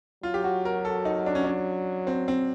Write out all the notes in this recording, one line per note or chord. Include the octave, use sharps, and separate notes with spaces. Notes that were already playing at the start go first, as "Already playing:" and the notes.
F#3 F4
G4
F#4
A#4
A4
D#4
D4
C#4
D4
C4
C4